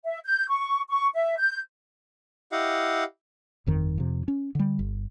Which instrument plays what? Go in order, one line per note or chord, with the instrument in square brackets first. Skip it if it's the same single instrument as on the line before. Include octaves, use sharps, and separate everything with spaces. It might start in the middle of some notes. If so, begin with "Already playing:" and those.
[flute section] E5
G6
C#6
C#6
E5
G6
[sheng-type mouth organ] E4 G4 D#5 F5 F#5
[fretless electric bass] G1 F2 D#3
F2 C3
C#4
D3 G3
G1